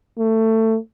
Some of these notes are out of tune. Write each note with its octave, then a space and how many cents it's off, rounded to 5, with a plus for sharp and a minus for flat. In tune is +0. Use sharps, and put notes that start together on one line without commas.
A3 +20